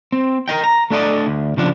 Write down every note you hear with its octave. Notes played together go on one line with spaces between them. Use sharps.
C4
A#4 B4 D#5 G5
A#5
A3 D4 A4 D5 D#5
D2
C#3 F3 D4